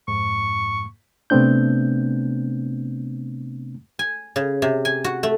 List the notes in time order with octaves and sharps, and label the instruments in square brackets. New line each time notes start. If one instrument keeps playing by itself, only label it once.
[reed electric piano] F2 G#2 [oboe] C#6
[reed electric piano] C3 A3 B3 C4 D4 G6
[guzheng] G#5
C#3
C3
G#5
F#4
A3